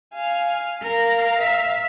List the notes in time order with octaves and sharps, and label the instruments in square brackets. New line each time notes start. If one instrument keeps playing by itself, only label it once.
[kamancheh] F5 G#5
[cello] A#4 [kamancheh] F5
[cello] E5